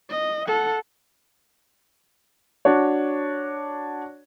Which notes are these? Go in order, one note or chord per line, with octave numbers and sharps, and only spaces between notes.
D#5
A4 F#5
D4 F#4 C#5